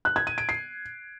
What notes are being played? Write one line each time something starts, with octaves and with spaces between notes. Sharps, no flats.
F#6
G#6
D#7
D7
C7